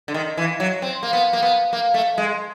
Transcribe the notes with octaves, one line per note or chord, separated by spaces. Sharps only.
D3
D#3
E3
F#3
C4
A#3
B3
A#3
B3
A#3
A3
G#3